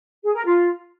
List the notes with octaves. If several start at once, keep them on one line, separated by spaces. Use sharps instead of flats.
G#4
A#4
F4